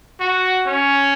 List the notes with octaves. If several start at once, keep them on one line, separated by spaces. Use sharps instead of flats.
F#4
C#4